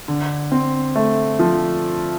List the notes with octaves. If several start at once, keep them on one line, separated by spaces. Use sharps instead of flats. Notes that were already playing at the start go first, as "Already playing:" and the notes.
D3
C4
A3
F3